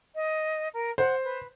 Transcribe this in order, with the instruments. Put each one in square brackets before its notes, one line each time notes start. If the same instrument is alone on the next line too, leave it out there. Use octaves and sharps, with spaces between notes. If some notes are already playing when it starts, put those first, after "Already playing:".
[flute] D#5
A#4
[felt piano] C5 [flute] F#5
[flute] B4